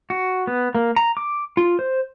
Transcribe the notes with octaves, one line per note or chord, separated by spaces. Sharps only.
F#4
B3
A#3
A#5
D6
F4
C5